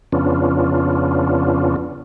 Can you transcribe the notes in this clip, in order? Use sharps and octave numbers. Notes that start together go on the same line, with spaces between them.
F2 C#3 B3 C#4 D4 F4